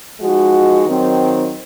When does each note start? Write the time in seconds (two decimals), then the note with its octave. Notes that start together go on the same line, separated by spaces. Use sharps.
0.19 F3 G#3 D#4 F#4
0.85 D#3 F#3 C4